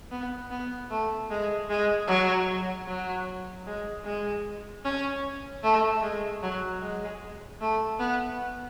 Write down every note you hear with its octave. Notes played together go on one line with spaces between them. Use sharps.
B3
B3
A3
G#3
G#3
F#3
F#3
G#3
G#3
C#4
A3
G#3
F#3
G#3
A3
B3